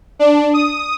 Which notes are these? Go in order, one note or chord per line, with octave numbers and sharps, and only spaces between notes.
D4
D#6